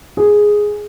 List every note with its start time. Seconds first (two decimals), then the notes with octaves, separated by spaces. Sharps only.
0.17 G#4